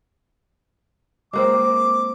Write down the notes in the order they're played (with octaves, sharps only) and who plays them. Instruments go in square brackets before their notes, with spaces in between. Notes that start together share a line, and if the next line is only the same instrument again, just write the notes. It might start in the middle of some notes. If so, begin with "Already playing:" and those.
[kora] G#3 A#3 C4 [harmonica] D6